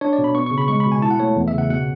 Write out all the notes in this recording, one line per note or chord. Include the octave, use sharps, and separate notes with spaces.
D4 C#5
D5
B2
B5
B3 C#6
C#3 C#6
B5
G#3 C#6
B5
B2
G#5
E4 A5
F#5
A3 C#5
E2
E5
C#3 F#5
B2 F#5